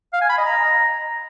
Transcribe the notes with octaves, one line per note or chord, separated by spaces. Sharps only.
F5
G#5
B5
D#5
A#5